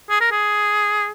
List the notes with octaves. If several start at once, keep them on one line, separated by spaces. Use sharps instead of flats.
G#4
A#4
G#4